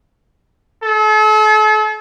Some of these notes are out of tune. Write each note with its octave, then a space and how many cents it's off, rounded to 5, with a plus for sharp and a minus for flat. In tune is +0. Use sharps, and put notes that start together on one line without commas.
A4 -40